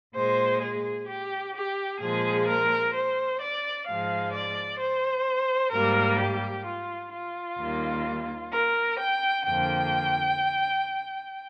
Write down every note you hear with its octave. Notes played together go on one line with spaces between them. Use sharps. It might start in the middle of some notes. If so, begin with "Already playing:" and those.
A#2 G#3 C5
G#4
G4
G4
A#2 F3 G#3 G#4
A#4
C5
D5
G#2 F3 G#3 F5
D5
C5
G#2 G3 A#3 A#4
G4
F4
F4
D#2 D#3 G3 A#3
A#4
G5
F2 D3 F3 A#3 G5